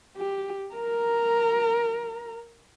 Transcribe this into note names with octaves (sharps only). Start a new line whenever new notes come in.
G4
A#4 A#5